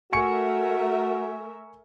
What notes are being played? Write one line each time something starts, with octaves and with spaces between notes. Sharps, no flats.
A3 F#4 A#4 E5 G#5 C#6 C#7